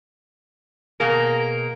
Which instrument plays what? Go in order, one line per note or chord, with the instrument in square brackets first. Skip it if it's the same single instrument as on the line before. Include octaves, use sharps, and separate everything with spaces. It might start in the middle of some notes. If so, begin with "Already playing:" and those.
[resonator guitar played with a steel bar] B2 A#3 G#4 [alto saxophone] A#4